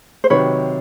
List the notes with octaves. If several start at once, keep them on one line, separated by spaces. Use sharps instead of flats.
C5
C3 D#3 F#3 B4 C#5